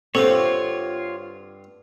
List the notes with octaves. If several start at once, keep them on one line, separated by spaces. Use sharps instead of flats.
G2 D3 C4 F4 A4 C5 C#5